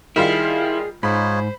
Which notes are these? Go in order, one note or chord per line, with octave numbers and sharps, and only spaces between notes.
D#3 G3 E4 F4 G#4
G#2 D#4 F4 C5 C#5 B5